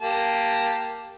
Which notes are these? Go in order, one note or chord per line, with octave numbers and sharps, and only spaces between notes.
A#3 G4 A5